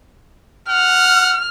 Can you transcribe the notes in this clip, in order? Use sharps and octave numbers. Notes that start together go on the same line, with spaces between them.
F#5 F6